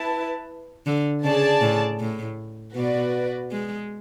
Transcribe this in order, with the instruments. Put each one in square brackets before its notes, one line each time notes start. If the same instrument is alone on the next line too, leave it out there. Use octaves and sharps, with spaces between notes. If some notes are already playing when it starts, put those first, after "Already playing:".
Already playing: [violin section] E4 B4 A5
[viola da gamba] D3
[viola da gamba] C#3 [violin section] G#4 D5 A5
[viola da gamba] A2
A2
[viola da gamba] B2 [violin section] F#4 B4 D5
[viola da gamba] G#3